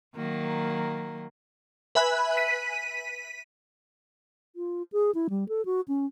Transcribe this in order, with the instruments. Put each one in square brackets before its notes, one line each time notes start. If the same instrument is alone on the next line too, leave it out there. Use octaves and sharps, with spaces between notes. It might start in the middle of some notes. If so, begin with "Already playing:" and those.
[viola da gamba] D#3 F#3 A#3
[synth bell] B4 E5 G#5 B5 F#6
B6 D#7
[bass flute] F4
G#4
E4
G3
A4
F#4
C#4